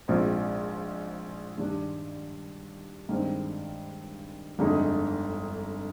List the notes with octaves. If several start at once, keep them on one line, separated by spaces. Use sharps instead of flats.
A#1 G#2 F3 C4
G2 D#3 G3 D4
G2 D#3 G#3 C4
G1 F2 D3 G#3 D#4